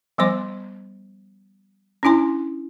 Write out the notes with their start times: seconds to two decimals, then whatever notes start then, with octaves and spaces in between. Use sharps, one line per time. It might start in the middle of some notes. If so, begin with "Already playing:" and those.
0.18 F3 G3 B3 C5 C6
2.03 C#4 D4 E4 G#5 C6